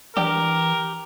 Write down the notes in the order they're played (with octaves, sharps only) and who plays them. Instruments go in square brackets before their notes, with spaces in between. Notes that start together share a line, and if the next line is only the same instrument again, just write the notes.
[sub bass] E3 [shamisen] D4 G5 A#5 [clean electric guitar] G4 [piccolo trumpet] A#4